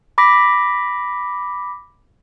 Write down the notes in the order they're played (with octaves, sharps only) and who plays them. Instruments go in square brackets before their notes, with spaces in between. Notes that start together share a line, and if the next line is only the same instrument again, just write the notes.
[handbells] B5 D6 A#6 B6